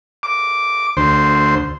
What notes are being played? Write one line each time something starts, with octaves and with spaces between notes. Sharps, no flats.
D6
D2 C5